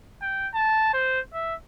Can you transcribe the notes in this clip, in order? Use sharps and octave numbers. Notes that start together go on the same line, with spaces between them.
G5
A5
C5
E5